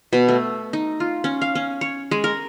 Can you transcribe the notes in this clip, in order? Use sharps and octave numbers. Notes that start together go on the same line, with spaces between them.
B2
A3
D#4
F4
C#4
F5
C#4
C#5
G#3
A#4